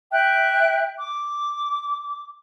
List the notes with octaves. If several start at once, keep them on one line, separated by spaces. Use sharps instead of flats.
E5 G5 F#6
D6